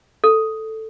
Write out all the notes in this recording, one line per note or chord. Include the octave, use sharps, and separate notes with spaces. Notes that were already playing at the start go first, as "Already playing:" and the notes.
A4